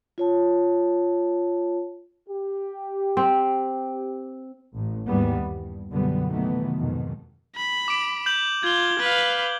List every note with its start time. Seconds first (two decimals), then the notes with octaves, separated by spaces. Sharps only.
0.18 F4 C#5 A5
2.28 G4
3.17 C4
4.74 A1
5.06 D#2 G#2 E3 G3 B3
5.38 G2
5.91 B1 F#2 D3 G3 B3
6.30 C3 D#3 E3 F#3 A3 B3
6.78 F2 G#2 B2 D#3
7.56 B5
7.88 D6 D7
8.26 G6 F#7
8.63 F4 G#6 G7
9.00 B4 F5